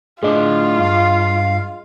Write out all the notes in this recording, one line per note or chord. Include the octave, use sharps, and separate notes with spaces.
A2 D4 F4 G#4 D#5
G2 F5